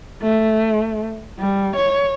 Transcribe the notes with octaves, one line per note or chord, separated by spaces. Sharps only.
A3
G3
C#5